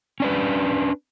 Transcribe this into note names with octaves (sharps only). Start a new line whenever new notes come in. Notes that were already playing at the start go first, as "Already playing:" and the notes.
C#4 D4 B4